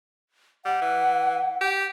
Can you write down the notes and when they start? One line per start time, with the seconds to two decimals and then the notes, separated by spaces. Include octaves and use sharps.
0.65 G3 F#5
0.82 E3
1.61 G4